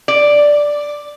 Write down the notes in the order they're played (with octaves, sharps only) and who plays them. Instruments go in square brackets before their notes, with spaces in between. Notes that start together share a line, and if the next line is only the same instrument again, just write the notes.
[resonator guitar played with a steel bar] D5